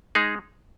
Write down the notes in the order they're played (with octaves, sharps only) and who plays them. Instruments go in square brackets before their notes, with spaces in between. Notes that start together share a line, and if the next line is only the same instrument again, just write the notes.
[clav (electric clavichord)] G#3 D#4 G#4